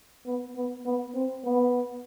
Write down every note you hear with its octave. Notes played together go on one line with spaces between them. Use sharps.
B3
B3
B3
C4
B3